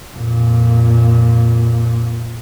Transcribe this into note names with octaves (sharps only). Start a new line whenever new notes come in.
F2 A#2